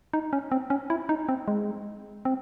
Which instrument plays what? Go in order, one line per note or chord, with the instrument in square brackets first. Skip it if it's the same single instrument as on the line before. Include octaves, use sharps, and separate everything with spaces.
[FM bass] D#4
C#4
C4
C#4
E4
D#4
C4
G#3
C4